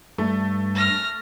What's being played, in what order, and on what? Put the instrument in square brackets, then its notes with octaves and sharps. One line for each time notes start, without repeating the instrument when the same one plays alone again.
[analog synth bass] G2 [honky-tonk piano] A3
[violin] F6 A#6